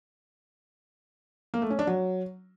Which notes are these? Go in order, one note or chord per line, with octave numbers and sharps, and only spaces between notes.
A#3
A3
C#4
D4
F#3